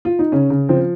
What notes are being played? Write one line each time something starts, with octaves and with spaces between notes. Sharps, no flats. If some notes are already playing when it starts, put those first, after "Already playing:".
F4
D#4
C#3 C#4
C#3
F3 C4